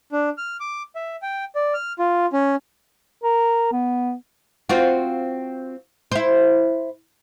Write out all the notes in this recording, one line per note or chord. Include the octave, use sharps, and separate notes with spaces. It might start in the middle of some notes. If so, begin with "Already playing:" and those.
D4
F6
D6
E5
G5
D5
F6
F4
C#4
A#4
B3
C4 F4 F#4
E4 C5